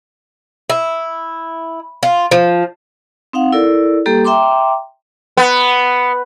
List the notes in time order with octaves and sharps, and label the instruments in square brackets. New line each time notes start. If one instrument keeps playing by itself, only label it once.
[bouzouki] E4
F4
F3
[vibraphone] C4 D#4 F5 F#5
E4 A4 A#4 D5
G3 A#3 G4 A4
E5 G5 A#5 C6 D6
[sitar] B3